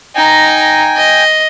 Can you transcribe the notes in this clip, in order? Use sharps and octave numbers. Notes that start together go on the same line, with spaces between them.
D#4 G5 G#5 A#5
D#5